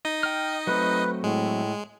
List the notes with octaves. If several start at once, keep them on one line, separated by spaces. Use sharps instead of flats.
D#4 D#5
G5 F6
F#3 A3 C4 B4
A2 G#3